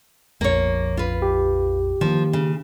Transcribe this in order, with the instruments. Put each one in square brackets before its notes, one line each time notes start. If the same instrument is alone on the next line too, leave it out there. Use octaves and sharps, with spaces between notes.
[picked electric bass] A#1 F2 [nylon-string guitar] A#3 C#5
[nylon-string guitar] F4 B4
[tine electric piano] G4
[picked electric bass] D#3 A#3 [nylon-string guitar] F3
[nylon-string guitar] C#3